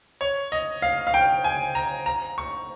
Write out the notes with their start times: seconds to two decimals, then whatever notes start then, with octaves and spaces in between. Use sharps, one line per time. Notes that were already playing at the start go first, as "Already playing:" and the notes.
0.21 C#5
0.52 D#5
0.82 F5
1.07 F5
1.14 G5
1.44 G#5
1.75 A#5
2.06 A#5
2.38 C#6